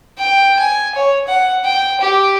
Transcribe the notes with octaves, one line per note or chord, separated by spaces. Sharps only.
G5
G#5
C#5
F#5
G5
G4